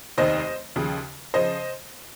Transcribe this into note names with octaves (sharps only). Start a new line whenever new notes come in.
F1 D#2 D#3 C5 D#5
D#2 C#3 F3
C#3 F3 C5 D#5